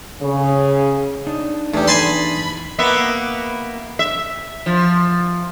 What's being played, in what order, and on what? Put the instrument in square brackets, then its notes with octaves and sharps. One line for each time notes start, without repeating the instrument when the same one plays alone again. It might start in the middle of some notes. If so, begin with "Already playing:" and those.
[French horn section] C#3
[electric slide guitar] D4 D#4
[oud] E2 [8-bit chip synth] A3 G4
[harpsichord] G#5 A5 C6 [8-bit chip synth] B5
[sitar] A#3 B3 E5
E5
F3